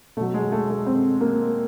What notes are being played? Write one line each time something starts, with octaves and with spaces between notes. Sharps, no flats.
B2 F#3 A3
G#3
A3
A3
C4
A#3